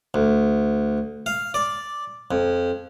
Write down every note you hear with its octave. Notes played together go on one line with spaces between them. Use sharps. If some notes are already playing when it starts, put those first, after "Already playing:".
D2
F5
D5
F2